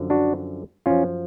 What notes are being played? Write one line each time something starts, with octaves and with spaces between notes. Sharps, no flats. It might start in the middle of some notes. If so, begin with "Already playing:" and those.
Already playing: F#2 D3 F3
D4 F#4
F#2 F3 C#4 F4